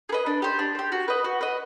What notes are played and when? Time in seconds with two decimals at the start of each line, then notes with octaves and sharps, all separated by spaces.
0.09 G#4
0.12 B4 D#5
0.26 D4
0.42 G4 C5
0.59 D4
0.75 G4 C5
0.92 F#4
1.08 B4 D#5
1.24 F#4
1.41 B4 D#5